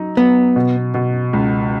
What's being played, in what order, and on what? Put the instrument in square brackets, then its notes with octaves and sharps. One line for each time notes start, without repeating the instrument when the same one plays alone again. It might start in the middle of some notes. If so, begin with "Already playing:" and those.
Already playing: [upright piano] F#3 D#4
[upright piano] F#3 [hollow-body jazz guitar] B3
[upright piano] B2
B2
C#2